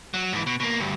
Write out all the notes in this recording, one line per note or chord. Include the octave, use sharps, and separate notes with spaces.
F#3
G#2 E3
B2
B2 A#3
D2 G2